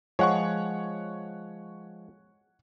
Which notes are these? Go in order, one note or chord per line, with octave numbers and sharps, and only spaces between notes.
F3 G#3 C#5 F#5 C#6